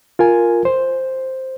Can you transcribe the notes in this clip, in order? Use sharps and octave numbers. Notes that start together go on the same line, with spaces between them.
F4 A#4 G#5
C5